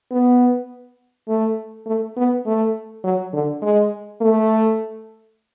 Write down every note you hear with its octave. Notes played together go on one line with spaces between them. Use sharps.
B3
A3
A3
B3
A3
F#3
D3
G#3
A3